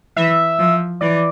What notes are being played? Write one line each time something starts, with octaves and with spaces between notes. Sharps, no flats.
E3 E5
F3
E3 D5